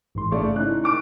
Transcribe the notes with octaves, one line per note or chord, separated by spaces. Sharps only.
A1 G#2 C6
C#3 A3 D5 C#6
C#4 D#4 E4 F#6
C#6 D6 D7